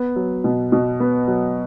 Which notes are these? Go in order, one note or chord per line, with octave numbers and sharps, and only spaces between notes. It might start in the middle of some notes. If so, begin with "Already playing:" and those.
Already playing: B3
F#3
B2
B2
B3
F#3